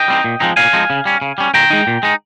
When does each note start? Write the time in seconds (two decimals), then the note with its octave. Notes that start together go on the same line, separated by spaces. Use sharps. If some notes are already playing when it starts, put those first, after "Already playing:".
Already playing: D#5 G5
0.08 G3 C4 D#4
0.24 A#2
0.40 F3 G#3 C4 D#4
0.56 A#2 F5 G#5
0.73 F3 G#3 C4 D#4
0.90 C#3
1.05 G3 C#4
1.22 C#3
1.38 G3 C#4
1.54 A#2 G5 A#5
1.70 G#3 D#4
1.87 A#2
2.03 G#3 D#4